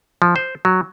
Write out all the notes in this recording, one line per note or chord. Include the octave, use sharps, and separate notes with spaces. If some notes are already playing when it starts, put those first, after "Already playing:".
F3
C5
F#3